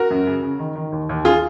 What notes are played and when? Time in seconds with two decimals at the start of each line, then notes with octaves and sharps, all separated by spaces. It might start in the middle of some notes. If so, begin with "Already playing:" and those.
Already playing: F#4 A#4
0.10 F#2
0.27 C#3
0.42 C#3
0.59 D#3
0.75 D#3
0.92 D#2
1.09 D#2
1.25 F4 G#4